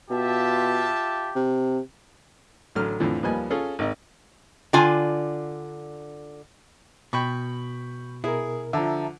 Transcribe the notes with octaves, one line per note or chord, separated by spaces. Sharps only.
B2 F4 G4 E5 A5
C3
A1 D3 F#3 F6
F2 A2 D3 E3 F3
D#2 F3 G3 B4 D#5 G#5
C#4 F4 G#4 A4
G#1 D#4 D#5
D3 F4 G#5
B2 G5 B5 C#6
B2 E4 G#4 A#4
D3 F3 E5 A5 A#5